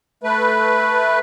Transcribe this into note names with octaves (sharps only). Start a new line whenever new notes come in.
A3 B4